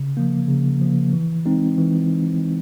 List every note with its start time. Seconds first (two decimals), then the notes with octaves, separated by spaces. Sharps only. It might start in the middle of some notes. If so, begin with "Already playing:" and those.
Already playing: C#3
0.17 F3 A#3
0.48 C#3
0.81 F3 A#3
1.13 E3
1.46 G#3 C4 D#4
1.78 E3